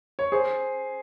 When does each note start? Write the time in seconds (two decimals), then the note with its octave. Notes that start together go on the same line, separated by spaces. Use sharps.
0.19 C#5
0.32 G#4 C5